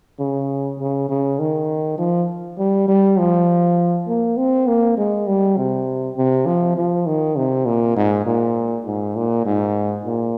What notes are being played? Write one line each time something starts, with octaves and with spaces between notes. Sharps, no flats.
C#3
C#3
C#3
D#3
F3
G3
G3
F3
A#3
C4
A#3
G#3
G3
C3
C3
F3
F3
D#3
C3
A#2
G#2
A#2
G#2
A#2
G#2
A#2